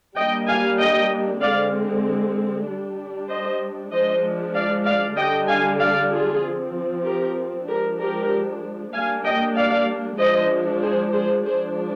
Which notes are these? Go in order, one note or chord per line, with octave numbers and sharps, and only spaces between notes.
G3 A#3 D4 D#5 G5
F5 G#5
D#5 G5
D3 G#3 C4 D5 F5
G3 D4
C5 D#5
F3 G#3 D4 C5 D#5
D5 F5
D5 F5
D3 G3 D4 D#5 G5
F5 G#5
D5 F5
F4 G#4
F3 C4
G4 A#4
F3 G#3 D4 G4 A#4
G4 A#4
G3 A#3 D4 F5 G#5
D#5 G5
D5 F5
F3 G#3 D4 C5 D#5
G#4 C5
G#4 C5
F3 G#3 D4 G#4 C5